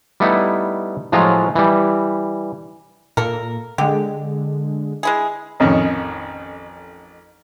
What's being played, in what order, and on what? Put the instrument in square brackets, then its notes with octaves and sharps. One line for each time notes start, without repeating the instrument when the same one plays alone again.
[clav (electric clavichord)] G3 A3 B3 D#4 E4
A2 F3 F#3 G#3 F4 A#5
E3 G3
[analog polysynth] A#2 [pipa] A4 A#4
[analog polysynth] D3 G#3 [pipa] G4
[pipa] G#3 E4 G#4
[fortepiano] A1 F2 D#3 C#4 D#4 C#5